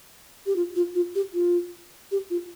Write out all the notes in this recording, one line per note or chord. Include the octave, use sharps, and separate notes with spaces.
G4
F4
F4
F4
G4
F4
G4
F4